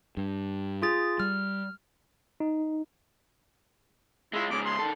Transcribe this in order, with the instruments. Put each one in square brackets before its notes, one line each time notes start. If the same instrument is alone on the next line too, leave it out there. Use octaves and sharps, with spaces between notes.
[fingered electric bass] G2
[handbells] F4 G#4 A6
[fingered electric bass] G3 [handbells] F6
[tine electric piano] D#4
[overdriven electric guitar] G#3 F4 [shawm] E4
[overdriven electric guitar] G#2 C#3 [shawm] D6
[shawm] C6
[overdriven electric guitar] D#3 A4